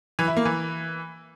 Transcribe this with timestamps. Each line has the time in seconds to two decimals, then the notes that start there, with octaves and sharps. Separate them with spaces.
0.19 E3
0.28 E4
0.37 A#3
0.45 E3